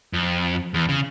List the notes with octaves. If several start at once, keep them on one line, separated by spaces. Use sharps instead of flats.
F2
E2
C#3